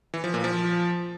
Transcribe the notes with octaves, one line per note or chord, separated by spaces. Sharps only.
E3
F3
A#2
F3